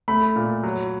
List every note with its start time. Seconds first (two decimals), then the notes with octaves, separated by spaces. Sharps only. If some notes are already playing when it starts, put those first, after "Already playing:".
0.08 A3 B5
0.36 A#2
0.63 F#3